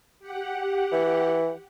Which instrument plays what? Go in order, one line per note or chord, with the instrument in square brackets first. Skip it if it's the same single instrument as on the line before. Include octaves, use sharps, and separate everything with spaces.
[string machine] G4 F#5
[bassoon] E3